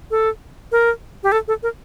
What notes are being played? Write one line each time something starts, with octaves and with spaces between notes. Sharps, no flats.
A4
A#4
G4
A4
A4
A#4